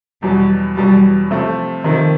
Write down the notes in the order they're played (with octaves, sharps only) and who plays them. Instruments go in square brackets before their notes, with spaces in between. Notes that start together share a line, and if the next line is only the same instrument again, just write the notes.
[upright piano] E2 B2 F#3 [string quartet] G3
[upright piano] E2 B2 F#3 [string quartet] G3
[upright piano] C3 F3 A3
[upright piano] C3 F3 A3 [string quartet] D#3